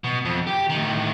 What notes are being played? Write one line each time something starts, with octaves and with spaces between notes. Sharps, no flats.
B2
F2
G4
A2 D#3